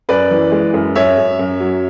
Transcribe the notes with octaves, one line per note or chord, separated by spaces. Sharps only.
F#2 B4 D5
E3
G#3
F#2
F#2 C#5 E5
F#2
F#2
F#3